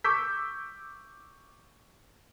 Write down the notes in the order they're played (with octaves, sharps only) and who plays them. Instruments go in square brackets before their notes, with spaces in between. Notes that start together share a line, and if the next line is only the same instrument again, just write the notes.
[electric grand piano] C#6 D6 E6 G6 B6